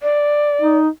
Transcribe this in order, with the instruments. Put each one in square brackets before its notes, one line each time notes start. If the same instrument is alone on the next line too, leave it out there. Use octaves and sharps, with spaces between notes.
[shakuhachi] D5
[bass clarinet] D#4